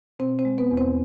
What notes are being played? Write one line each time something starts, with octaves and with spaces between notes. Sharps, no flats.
B2 C4 C5
C4 C5
G#3
B3 B4
E2
C4 C5